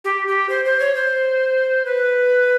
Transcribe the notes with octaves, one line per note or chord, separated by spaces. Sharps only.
G4
G4
C5
C5
C#5
C5
B4